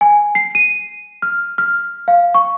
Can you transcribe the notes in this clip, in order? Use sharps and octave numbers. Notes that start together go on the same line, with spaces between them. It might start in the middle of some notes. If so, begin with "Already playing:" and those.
G#5
C7
D#7
F6
F6
F5
C#6